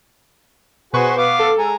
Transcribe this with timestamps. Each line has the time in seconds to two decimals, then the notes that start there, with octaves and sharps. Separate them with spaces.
0.93 B2 F#4 G#4 B4 C5 C#6
1.17 B3 F5 D6
1.39 A4
1.58 G#3 G#5 A#5